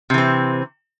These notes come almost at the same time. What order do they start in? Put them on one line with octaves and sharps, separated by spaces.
C3 E3 C4